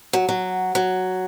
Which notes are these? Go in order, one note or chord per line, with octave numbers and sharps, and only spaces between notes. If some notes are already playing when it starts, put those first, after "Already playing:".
F#3
F#3
F#3